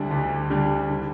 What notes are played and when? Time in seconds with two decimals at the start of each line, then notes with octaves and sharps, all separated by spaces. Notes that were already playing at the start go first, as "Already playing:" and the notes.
Already playing: D2 D3 G3 D4
0.11 D2
0.50 D3 G3 D4
0.89 D3